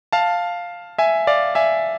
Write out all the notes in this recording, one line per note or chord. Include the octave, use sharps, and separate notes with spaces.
F5 A5
E5 G#5
D5 F5
E5 G#5